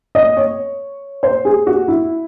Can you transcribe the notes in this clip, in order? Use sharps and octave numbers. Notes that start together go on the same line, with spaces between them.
D#5
C#5
C5
G#4
F#4
E4